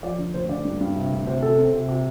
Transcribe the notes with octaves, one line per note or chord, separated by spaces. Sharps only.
F3 D5
D3
D2 C5
D3 D5
G2
G2
C3
D2
C3 C5
C3 A4
C4
C3
C3